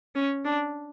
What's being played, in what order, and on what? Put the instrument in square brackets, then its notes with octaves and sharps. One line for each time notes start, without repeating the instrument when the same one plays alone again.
[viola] C#4
D4